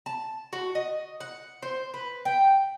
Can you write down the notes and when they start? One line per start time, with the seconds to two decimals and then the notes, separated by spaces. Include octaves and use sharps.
0.06 A5
0.53 F#4
0.75 D#5
1.20 F#5
1.62 C5
1.94 B4
2.25 G5